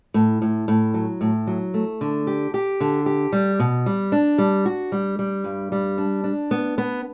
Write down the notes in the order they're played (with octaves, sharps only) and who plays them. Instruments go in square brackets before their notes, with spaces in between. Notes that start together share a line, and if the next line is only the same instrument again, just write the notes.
[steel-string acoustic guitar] A2
A2
A2
F#3
A2
F#3
A3
D3
G4
G4
D3
G4
G3
B2
G3
D4
G3
F#4
G3
G3
G2
G3
D4
D4
B3
B3